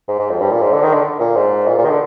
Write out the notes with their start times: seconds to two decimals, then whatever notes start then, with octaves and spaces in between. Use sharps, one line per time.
0.08 G#2
0.19 G#2
0.30 F2
0.40 G2
0.51 A#2
0.62 G#2
0.72 D3
0.83 D#3
0.93 D3
1.20 A#2
1.36 G#2
1.67 A#2
1.78 A#2
1.85 D#3
1.89 D3